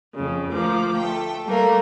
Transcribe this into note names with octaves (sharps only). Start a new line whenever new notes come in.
F2 C#3
D2 F3 A#3 D6
A3 G5
G3 A3 A#3 A#4